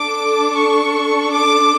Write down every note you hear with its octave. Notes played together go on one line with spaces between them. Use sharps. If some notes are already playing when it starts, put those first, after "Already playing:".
Already playing: D4 A4 D6
C#6
D6